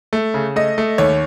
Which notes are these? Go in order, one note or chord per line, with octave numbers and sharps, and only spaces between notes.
A3
C#3
A3 D#5
A3
D#2 C#5